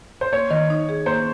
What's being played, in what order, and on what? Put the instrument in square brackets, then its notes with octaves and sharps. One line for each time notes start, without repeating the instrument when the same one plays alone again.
[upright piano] C5
[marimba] A#3 [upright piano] C#5
[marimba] D#3
D#4
G#4
[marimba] A#3 [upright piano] C5